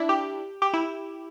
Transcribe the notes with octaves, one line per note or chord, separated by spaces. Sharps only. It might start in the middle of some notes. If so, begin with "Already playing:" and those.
Already playing: D4 E4
G4
G4
E4